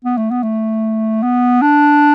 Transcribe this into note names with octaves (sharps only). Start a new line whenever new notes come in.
B3
A3
B3
A3
B3
D4